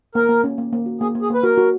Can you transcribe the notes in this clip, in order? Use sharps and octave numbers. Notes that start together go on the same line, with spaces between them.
A#3 A#4
A#3
C#4
A#3
A#3
F#4
A#3 G#4
A#3
G#4
A#3 B4
F#4 A#4
F#4